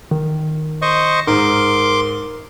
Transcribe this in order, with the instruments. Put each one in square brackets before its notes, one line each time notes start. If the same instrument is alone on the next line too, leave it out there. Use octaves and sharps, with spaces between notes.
[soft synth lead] D#3
[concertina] C5 D#5 C#6
[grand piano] G#2 [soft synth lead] A#4 [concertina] C6 D6